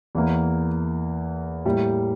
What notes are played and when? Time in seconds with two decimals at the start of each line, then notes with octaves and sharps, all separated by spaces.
0.15 E2 E3 A#3
1.65 A2 G3 A#3 E4 G4